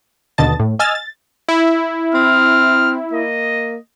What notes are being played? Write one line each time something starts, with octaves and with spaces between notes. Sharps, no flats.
D#2 B2 D3 D#5 A5 A6
A2
D#5 G#5 E6 F6 A6
A6
E4
C4 F6
A#3 D#5